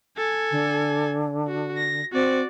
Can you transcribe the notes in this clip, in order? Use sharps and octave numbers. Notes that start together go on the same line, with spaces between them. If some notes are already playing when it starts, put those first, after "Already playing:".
A4 G#5
D3
F#4
A#6
C4 F#4 D5